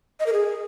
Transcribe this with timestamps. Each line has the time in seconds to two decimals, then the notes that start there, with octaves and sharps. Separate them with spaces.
0.20 D#5
0.26 A#4
0.33 G#4